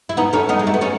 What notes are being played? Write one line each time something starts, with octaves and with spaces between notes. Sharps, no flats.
E4
B3 D#4
A3 C#4
B3 D#4
G#3
A3
B3
A3 C#4